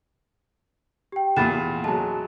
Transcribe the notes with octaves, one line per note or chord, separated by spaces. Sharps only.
G4 G5
E2 A#2 B5 A6 E7
F#3 G#3 A5